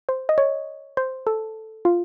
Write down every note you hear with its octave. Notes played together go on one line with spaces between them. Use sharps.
C5
D#5
C#5
C5
A4
F4